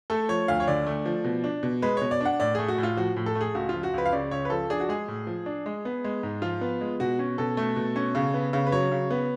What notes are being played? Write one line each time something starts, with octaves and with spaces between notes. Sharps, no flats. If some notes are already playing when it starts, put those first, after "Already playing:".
A3 A4
F3 C#5
D2 F5
C#5
D3 D5
A3
F3
B2
D4
B2
G#3 B4
B2 C#5
D5
D4 F#5
A2 D5
A3 G#4
F#4
A2
F4
F3 F#4
A2
A4
A3
G#4
C#2 F#4
F3 F4
F#4
C#2 B4
F5
C#3 D5
C#2 C#5
B4
F3 A4
D4 G#4
F#4
G#3 G#4
A2
F3
D4
G#3
B3
G#3
G#2
F3 F4
B3
G#3
B2 F#4
C#4
B2 A4
A3
B2
C#4
C#3
B3
C#3
B4
F#3 C#5
C#3
B3